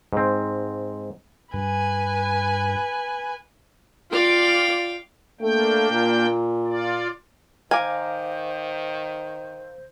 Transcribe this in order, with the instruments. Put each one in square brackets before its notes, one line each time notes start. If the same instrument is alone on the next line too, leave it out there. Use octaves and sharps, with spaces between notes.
[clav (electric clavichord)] G#2 C4
[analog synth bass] G2 [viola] B4 G#5
[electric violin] F4 D5 [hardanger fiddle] F5 G5
[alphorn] A3 [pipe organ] A#3 D4 G5
[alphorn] A#2
[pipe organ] F4 D5
[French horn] D#3 [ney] C5 [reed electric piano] F5 A#5 D6 [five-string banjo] G#5